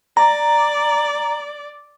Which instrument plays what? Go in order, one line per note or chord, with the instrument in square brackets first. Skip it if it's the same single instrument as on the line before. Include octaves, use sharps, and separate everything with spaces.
[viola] D5 [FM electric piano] A#5